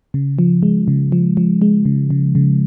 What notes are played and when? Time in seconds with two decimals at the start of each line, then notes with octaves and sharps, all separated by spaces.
0.14 C#3
0.39 F3
0.63 G#3
0.88 C#3
1.12 F3
1.37 F3
1.62 G#3
1.85 C#3
2.10 C#3
2.35 C#3